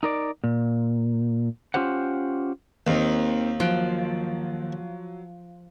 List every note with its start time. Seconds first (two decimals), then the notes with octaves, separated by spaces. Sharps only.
0.03 D#4 A#4 D5
0.44 A#2
1.74 C#4 F4 G4 C5 F#5
2.87 D#2 A#3 C4 D#4
3.60 F3 F#3 F#6 D7